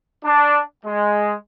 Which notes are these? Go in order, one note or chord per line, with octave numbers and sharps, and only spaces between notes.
D4
G#3